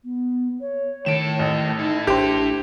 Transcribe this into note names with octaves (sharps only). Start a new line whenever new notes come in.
B3
C#5
A2 D#3 A4 D7 E7
A1
D#4 E4 A4
A1 D4 G4 C5